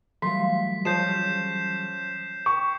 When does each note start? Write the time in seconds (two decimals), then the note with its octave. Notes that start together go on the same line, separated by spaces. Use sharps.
0.22 E3 F#3 G3 A3 F4 C6 B6
0.85 F3 C#4 G#4 D#5 G6 C7 E7
2.46 G5 C#6